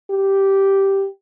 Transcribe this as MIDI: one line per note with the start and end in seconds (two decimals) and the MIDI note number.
0.11 1.07 67